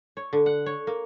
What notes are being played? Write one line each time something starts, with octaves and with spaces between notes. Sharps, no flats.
C#5
D3
F#5
C#5
A#3